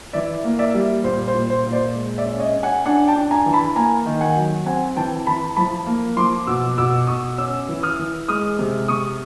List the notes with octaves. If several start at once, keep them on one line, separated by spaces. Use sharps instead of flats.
E3 D5 E5
A#3
D5 E5
G3
A#2 C5
C5
A#2
C5
A#2
C5 D5
G#3
D5 E5
C#4
C#5 D#5
C#4
F#5 G#5
D4 F#5 G#5
G5 A5
D4
G#5 A#5
E3
A5 B5
A#3 G#5 A#5
D#3
F#5 G#5
F#3
C4 F#5 G#5
E3 G5 A5
E3 A5 B5
F3 A5 B5
A#3
F3 C6 D6
B2 D6 E6
B2 D6 E6
B2 C#6 D#6
C#4 D6 E6
E3
D#6 F6
E3
G#3 D#6 F6
C3
C3 C#6 D#6